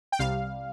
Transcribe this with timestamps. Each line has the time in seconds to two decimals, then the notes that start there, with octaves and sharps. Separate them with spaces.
0.12 G5
0.19 C2 C3 G3 F5